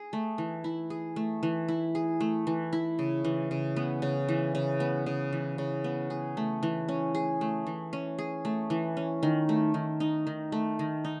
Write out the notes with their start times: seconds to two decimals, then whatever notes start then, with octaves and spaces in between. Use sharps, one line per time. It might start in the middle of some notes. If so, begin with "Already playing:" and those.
Already playing: G#4
0.13 A3
0.38 E3
0.64 E4
0.90 G#4
1.16 A3
1.43 E3
1.68 E4
1.95 G#4
2.20 A3
2.47 E3
2.73 E4
2.99 C#3
3.25 E3
3.51 C#3
3.76 B3
4.02 C#3
4.29 E3
4.55 C#3
4.80 B3
5.06 C#3
5.33 E3
5.58 C#3
5.84 B3
6.10 G#4
6.37 A3
6.63 E3
6.88 C#4
7.15 G#4
7.41 A3
7.67 E3
7.93 C#4
8.18 G#4
8.45 A3
8.70 E3
8.97 C#4
9.23 D#3
9.49 A3
9.74 D#3
10.00 D#4
10.27 D#3
10.52 A3
10.79 D#3
11.05 D#4